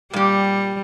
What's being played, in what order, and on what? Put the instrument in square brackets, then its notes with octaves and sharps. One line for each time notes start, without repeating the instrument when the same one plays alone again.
[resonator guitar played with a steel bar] A#2 G4 [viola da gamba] G3